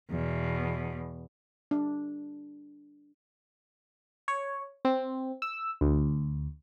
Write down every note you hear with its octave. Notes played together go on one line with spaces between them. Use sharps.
E2 B2
D4
C#5
C4
E6
D2